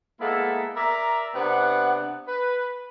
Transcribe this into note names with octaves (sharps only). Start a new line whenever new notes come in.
G#3 A#3 B3 E4 A4
A#4 D5 E5 A#5
C3 B3 D4 F#5
B4